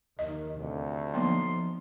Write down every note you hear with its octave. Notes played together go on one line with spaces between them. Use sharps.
D#2 D#3 D#5
D2 C3
F3 F#3 A#3 B3 D#4 C6